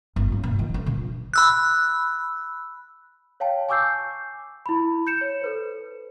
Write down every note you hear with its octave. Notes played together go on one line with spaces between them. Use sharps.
G1
F#1
A#2
D#3
D3
A#2
B5 E6 F#6
C#5 F5 G5 A5
G#5 C#6 D6 E6 G6 C7
E4 B5
G6 C#7 E7
C#5
A4 B4 C5